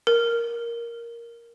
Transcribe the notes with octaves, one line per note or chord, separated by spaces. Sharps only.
A#4